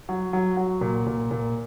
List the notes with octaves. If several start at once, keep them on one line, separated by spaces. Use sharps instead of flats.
F#3
F#3
F#3
A#2
A#2
A#2